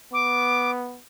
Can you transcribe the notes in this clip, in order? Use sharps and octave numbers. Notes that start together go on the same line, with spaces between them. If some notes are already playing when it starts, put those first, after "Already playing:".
B3 D6